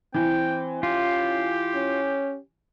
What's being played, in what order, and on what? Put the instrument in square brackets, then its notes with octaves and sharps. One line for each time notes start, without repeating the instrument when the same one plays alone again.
[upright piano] E3 [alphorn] C4 [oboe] G5
[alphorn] C#4 [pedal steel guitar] F4 [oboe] G4
[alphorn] C#4